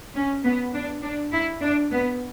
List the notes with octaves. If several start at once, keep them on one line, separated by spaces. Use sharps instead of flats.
C#4
B3
D4
D4
E4
D4
B3